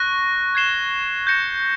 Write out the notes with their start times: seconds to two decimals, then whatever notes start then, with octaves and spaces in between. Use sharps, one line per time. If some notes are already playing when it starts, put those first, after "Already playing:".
Already playing: C#6 F#6 A#6
0.55 G#6 C7 E7 G7
1.27 G6 A#6 C#7 E7